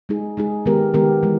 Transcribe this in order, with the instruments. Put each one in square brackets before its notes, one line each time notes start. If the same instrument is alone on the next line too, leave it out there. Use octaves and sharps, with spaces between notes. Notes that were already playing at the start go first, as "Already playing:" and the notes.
[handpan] G#3 D#4 G#4
G#3 D#4 G#4
D#3 G#3 B3 G4 A#4
D#3 G#3 B3 G4 A#4
E3 G#3